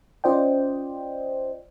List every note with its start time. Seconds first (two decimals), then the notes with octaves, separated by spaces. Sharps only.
0.24 C#4 F4 C5 D5 D#5 G5